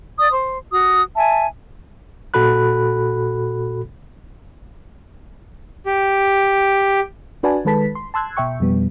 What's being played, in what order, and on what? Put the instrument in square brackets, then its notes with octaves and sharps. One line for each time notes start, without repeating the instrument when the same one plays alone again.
[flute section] D5 D#6
C5
F#4 D#6
E5 G#5 A5
[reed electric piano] A#2 F#4 A4 B5 F#6
[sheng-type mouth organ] G4
[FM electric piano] D4 F#4 B4 D5 G#5 A5
D#3 G#3 A4 B4 A5 B6
C6
A5 C6 E6 F#6 G#6
B2 E5 G5 C#6
F2 B2 G3 B3